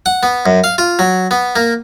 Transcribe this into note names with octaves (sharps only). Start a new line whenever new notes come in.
F#5
B3
F#2
F5
F4
F#3
B3
A#3